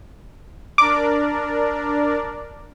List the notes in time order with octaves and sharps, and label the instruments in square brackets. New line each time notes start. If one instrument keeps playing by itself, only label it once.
[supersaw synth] D4 A#4 D5 [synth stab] D6